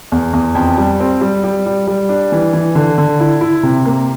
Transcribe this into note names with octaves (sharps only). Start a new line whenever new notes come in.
E2
E2
F2
G3
C4
G3
G3
G3
G3
D4
E3
E3
D3
D3
E4
E4
C3
A#3